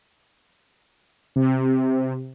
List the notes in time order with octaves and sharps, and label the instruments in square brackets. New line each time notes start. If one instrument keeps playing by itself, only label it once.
[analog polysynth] C3